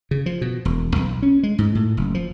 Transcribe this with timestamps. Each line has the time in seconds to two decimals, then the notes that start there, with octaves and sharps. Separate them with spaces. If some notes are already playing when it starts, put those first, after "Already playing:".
0.11 C#3
0.26 F3
0.41 B2
0.65 E1
0.96 B1
1.22 C#4
1.43 G#3
1.59 G#2
1.75 A2
1.97 F#1
2.14 F3